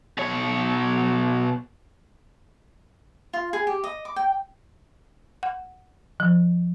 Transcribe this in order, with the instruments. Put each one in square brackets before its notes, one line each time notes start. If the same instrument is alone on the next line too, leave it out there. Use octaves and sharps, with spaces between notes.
[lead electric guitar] B2 C#5
[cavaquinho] F4
G#4
G4
D#5
D6
G5
[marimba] F#5
F3